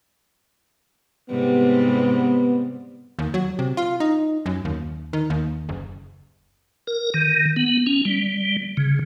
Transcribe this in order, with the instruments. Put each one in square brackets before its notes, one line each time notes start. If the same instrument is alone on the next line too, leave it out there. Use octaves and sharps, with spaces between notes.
[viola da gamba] G#2 C3 G3 [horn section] B3
[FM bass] D#2
F#3
C3
F4
D#4
F#2
D#2
D#3
D#2
F#1
[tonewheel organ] A#4
D#3
B3
C#4
G3
C#3